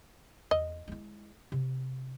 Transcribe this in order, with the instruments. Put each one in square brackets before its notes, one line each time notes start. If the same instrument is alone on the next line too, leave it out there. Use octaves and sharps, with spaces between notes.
[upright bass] E2 [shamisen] D#5
[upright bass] G#3 E4
C3